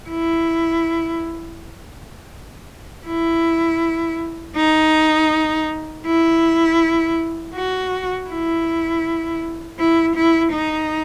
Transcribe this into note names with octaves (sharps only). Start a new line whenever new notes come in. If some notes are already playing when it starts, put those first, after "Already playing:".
E4
E4
D#4
E4
F#4
E4
E4
E4
D#4